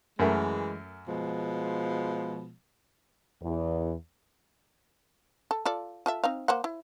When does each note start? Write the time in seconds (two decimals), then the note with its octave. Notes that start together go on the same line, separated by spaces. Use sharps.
0.19 F#2 E3 G#3 A3 A#4
1.08 B2 F3 G#3
3.42 E2
5.51 A4
5.65 F4 A4 D5
6.06 F4 A4 E5
6.24 C4 D#4 F5
6.48 A#3 C5 F#5
6.64 E4